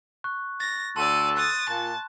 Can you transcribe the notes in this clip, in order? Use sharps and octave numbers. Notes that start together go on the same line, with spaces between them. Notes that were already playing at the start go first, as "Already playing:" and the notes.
C#6 F#6
A6 A#6
D2 A4 D5 C6 A6 D#7
D#6 F#6 A6
A#2 A5